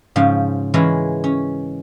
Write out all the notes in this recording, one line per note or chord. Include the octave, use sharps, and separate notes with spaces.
G#2 C#3 F3
E3 G#3 C#4 E4 A#4
C#4